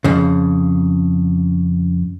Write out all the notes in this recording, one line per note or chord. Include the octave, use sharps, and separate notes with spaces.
F2 C#3